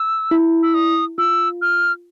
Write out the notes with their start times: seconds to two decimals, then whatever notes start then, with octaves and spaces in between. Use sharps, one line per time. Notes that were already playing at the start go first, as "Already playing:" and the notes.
Already playing: E6
0.31 E4
0.63 E6
0.74 D#6
1.18 F4 E6
1.62 F6